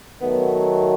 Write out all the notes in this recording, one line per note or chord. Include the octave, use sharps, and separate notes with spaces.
D#3 F#3 A3 B3